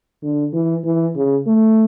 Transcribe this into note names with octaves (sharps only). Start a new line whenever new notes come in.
D3
E3
E3
C#3
A3